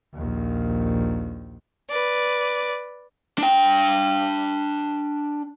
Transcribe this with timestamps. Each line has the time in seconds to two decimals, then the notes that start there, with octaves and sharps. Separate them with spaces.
0.14 A#1 D#2
1.91 B4 D5
3.38 D4 G5